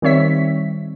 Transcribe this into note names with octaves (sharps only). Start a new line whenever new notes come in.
D#3 G3 C4 C#5 E5 B6